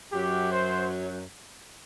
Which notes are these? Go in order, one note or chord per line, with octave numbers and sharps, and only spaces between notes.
F#2 F#3 G4
C5